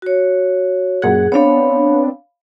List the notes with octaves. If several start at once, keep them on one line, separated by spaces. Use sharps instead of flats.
F#4 C#5
F#2 A#2 G#4 F#5
B3 C4 D4 C#5 F5 B5